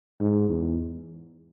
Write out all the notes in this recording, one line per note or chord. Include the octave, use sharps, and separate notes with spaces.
G#2
E2